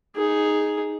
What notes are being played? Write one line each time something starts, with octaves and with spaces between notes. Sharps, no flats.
D#4 G#4